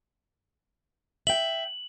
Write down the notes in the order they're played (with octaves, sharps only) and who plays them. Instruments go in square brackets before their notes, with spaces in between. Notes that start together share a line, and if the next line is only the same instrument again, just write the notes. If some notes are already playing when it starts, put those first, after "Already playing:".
[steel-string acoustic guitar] E5 G5 [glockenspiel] F#7